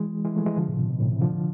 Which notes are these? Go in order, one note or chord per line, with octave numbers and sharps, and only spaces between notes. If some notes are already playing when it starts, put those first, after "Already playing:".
Already playing: E3 G#3
E3 G#3
F3 A3
E3 G#3
D3 F3
A2 C3
B2
B2
A2 C3
C3 E3
D3 F3